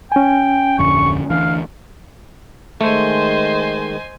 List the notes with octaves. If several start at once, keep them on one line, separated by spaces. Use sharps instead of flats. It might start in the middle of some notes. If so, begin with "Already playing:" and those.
C#4 G5 G#5
D1 F2 D3 C#6
D2 E3 D4 F5
D#3 G#3 A3 C5 D#5 G#5